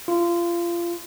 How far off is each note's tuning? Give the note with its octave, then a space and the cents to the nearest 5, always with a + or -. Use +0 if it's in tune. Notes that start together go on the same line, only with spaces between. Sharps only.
F4 -25